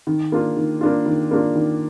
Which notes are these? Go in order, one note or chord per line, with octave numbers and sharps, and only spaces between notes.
D#3
A#3 D4 F4
D#3
A#3 D4 F4
D#3
A#3 D4 F4
D#3